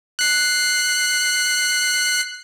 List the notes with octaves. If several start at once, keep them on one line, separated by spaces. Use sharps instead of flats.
F#6 C7